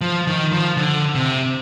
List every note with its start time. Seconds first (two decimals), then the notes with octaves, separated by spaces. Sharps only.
0.01 F3
0.27 D#3
0.52 F3
0.77 D3
1.15 C3